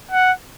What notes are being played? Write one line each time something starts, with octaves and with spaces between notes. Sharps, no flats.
F#5